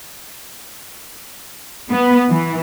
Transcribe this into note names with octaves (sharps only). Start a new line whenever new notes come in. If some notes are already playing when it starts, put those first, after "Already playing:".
B3
E3